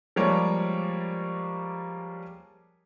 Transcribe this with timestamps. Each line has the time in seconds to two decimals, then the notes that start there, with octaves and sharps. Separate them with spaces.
0.16 F3 G3 G#3 A#3 C#5 D5